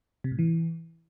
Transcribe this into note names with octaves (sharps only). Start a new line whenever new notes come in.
C3
A2
E3